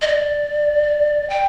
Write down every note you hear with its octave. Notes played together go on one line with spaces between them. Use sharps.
D#5
D5
G5